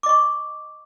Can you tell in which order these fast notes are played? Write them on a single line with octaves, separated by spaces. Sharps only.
D6 D#5 C#6